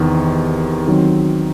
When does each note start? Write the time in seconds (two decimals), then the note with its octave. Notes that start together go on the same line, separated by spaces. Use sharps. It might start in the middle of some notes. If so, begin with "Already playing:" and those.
Already playing: E2 C3 D#3
0.88 D#3 F#3 C4